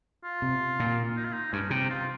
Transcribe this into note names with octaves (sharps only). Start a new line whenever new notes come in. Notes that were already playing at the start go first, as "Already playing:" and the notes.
F4
C3
A#2
D#4
F4
D#4
G2 C#4
C3 D#4
F4